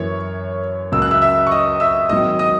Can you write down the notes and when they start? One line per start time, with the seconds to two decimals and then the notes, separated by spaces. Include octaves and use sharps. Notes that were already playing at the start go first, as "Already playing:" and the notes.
Already playing: F#2 E3 A#3 C#5
0.92 C#2 C#3 F#3 A#3 E6
1.02 F#6
1.11 E5 E6
1.22 E5 E6
1.47 C#6
1.51 D#5 D#6
1.80 E5 E6
2.09 G#1 G#2 D#3 F#3 D#5 D#6
2.39 D#5 D#6